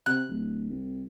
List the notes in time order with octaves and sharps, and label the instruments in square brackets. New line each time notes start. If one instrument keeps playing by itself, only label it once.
[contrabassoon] C3 [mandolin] F#6
[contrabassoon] D1
C2